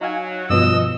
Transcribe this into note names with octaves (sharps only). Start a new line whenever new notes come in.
F#3 D#4 F#4 F5 G#5
G2 B2 F3 D#5 E6